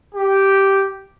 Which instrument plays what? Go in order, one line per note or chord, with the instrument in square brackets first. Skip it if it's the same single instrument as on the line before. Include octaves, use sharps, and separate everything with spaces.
[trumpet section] G4